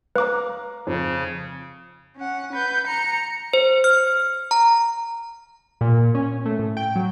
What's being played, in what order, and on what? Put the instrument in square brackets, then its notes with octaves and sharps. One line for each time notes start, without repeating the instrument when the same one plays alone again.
[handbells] B4 D6 [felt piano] F5 A#5
[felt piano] F2 [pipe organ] C#3
[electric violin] C#4 F#5
B4 G6
A#5 C#7
[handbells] C5
F6
A#5
[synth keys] A#2
C#4
A3
A2
G5
F#3